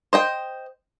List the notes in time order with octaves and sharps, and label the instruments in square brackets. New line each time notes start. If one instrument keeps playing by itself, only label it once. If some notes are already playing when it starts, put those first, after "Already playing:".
[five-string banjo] C5 D#5 G5